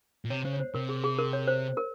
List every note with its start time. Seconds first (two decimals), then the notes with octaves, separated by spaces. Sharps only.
0.25 A#2
0.30 C3 C#5
0.45 C#3 C5
0.53 C#5
0.60 C5
0.74 C3 A#4
0.89 G#4
1.04 G#4
1.18 A#4
1.33 C#5
1.47 C5
1.77 A#4